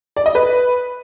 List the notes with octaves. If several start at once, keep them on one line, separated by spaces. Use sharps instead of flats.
D5
D#5
B4